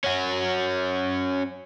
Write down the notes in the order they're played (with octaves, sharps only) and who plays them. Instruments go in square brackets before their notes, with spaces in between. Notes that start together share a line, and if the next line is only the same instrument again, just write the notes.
[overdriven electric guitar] C#4 F#4